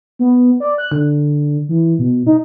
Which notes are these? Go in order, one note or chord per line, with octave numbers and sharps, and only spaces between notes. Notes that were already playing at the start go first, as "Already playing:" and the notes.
B3
D5
F#6
D3
E3
B2
D#4